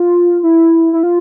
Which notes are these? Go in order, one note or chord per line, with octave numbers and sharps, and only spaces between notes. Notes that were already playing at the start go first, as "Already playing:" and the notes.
Already playing: F4
E4
E4
F4